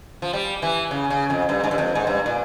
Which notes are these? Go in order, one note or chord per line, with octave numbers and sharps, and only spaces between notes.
F3
G3
E3
C#3
C#3
F2
G2
G#2
G2
F2
G#2
G2
A#2